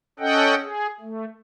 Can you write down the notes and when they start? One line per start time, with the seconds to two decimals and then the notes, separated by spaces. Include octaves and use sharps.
0.19 C#4 A4 D#5 F#5 G5
0.62 G#4
1.01 A3